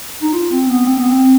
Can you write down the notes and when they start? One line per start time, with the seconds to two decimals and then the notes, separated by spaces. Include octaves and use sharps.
0.22 D#4
0.33 F4
0.51 C4
0.68 B3
0.86 C4
0.98 B3
1.09 C4